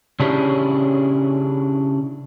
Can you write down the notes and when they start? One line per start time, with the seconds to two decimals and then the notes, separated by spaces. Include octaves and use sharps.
0.20 C#3 C#4 D4 E4 G4 G#4